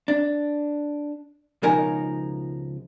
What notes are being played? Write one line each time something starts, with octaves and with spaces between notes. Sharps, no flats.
D4
C#2 B2 F3 D#4 A#4 G#5